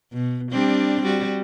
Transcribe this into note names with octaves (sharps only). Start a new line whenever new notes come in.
B2
G3 C4 D4
G3 F#4